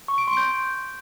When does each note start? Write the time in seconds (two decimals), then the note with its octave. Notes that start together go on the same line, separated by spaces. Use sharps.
0.08 C#6
0.18 D7
0.27 C6
0.37 G6